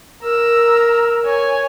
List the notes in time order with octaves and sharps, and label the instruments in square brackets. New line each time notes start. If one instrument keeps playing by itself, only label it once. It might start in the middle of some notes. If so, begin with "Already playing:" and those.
[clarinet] A#4 [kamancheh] A#5 E6
[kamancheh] C#5 G#5